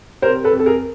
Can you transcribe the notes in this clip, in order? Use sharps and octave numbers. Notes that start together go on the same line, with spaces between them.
C3 A#4 C5
A4 B4
F2
A4
G#4 A#4